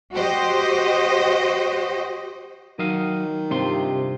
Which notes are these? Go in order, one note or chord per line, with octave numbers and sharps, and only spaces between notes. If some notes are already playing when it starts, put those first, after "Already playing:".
F#4 G4 C5 D#5
D#3 F#3 D#5 F5
G2 C3 F4 C6